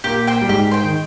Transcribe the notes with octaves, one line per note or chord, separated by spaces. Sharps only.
A#2 A#3 G4
C5 G5
G3
G#2 G#3 G4
C5 G5
D#3